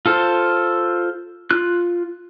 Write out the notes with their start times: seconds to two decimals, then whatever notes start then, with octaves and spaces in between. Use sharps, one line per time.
0.06 F4 A4 C5
1.51 F4 F#6